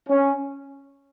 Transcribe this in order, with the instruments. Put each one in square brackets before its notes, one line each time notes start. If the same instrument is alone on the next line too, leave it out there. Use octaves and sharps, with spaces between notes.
[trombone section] C#4